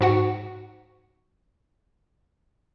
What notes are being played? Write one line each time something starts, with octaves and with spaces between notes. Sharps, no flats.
G#2 F#4 F#5